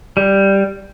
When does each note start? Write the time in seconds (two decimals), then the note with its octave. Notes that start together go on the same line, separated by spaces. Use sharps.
0.17 G3